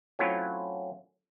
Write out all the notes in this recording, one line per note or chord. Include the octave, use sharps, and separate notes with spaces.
F#3 A3 C4 C#4 E4 F4